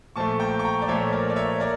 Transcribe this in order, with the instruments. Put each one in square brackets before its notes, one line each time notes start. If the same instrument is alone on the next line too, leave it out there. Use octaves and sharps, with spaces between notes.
[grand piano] A#2 F3 A3 A5 C#6
G5 A#5
C#6
G5 A#5
D5
A#2 F3 A3 C#5 E5
A#4 D5
D5
C#5 E5
A#4 D5